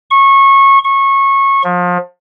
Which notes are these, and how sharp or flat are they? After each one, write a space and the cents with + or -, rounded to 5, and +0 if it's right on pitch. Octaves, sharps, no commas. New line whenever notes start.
C#6 -20
C#6 -20
F3 +30